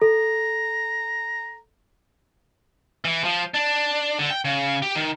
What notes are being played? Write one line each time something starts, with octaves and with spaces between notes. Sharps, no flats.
A4 A#5
E3
F3
D4
D3
G5
C#3
G4
D#3